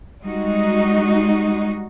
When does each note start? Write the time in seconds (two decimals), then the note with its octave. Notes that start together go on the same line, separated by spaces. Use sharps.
0.23 G3 G#3 D#4 F#4